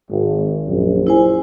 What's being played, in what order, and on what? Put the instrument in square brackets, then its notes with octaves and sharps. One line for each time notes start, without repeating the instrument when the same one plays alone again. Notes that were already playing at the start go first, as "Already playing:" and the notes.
[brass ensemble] G#1
A#1 F#2
[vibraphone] E4 C5 G#5